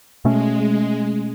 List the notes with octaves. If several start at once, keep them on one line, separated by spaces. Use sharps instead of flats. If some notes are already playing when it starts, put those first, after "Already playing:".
B2 G#3 A3 C#4